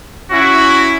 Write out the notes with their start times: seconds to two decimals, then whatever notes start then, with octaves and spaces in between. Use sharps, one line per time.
0.30 C#4 E4 F#4